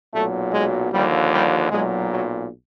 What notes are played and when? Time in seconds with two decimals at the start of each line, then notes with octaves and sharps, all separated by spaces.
0.14 B1 A#2 F#3 A3
0.52 G#3
0.92 D#2 D3 F3 G3
1.32 G3
1.70 B1 A#2 F#3 G#3
2.11 F#3